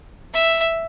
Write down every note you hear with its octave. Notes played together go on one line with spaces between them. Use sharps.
E5